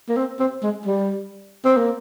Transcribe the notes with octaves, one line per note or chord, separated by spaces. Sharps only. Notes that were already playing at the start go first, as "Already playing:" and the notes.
A#3
C4
C4
G#3
G3
C4
A#3